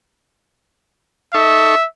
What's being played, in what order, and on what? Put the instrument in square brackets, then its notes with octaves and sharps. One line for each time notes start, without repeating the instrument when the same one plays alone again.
[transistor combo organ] D#4 A4 C#6 [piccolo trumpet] E5